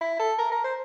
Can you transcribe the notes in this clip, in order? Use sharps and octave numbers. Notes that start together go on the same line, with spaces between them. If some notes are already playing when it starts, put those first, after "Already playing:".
E4
A4
A#4
A#4
C5